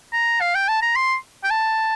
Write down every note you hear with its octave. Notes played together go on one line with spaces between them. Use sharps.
A#5
F5
G5
A5
A#5
C6
G5
A5